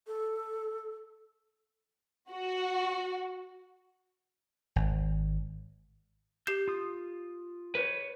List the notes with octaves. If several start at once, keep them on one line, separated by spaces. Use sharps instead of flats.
A4
F#4
G#1
G4 G6 C7 E7
F4 D#6
B4 C#5